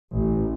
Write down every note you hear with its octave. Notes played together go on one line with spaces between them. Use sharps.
A1